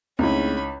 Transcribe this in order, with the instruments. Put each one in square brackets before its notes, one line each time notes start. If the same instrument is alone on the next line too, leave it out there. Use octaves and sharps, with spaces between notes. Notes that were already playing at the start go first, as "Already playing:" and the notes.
[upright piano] C#2 [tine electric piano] A3 C4 G#4 [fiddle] C#4 B5 [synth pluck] D#4 E4